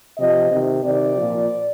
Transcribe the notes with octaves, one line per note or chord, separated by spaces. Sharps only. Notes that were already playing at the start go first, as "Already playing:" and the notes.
C3 F3 D#5
C3 D#3
C3 D#3 D5
A#2 F3